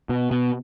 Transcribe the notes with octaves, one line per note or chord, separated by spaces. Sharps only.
B2
B2